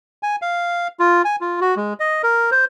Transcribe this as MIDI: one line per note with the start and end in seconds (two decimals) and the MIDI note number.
0.23 0.36 80
0.42 0.88 77
0.99 1.22 65
1.25 1.36 80
1.41 1.60 65
1.61 1.75 66
1.77 1.93 56
2.00 2.22 75
2.23 2.50 70
2.51 2.65 72